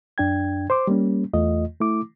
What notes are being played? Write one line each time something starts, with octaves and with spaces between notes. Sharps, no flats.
F#2 D4 G5 G#6
C5 C6 D6
G3 A#3 C#4
E2 A3 F4 D#5
A3 E4 D6